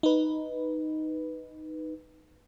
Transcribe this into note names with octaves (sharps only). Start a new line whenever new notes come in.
D#4 B4